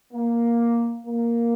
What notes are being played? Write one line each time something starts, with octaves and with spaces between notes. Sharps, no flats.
A#3
A#3